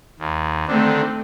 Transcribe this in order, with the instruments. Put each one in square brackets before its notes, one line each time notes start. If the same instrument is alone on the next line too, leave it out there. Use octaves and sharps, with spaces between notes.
[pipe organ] D#2
[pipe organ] D3 D#3 D4 [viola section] A3 C4